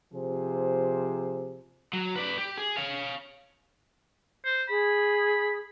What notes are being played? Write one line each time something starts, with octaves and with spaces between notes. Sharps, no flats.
C3 F3 G#4 C5
F#3
B4 D5
G4
G#4
C#5 F5
C5
G#4 B5